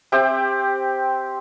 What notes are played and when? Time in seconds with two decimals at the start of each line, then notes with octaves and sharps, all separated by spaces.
0.12 C4 G4 E5 G5